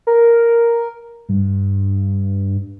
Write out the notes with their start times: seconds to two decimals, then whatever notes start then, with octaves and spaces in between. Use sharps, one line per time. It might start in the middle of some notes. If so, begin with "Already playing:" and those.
0.07 A#4
1.29 G2